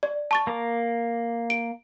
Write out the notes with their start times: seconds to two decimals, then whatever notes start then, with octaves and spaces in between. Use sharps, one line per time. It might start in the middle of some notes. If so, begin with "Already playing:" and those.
0.03 D5
0.31 A5 C#6 A6
0.47 A#3 A#5 D6
1.50 D7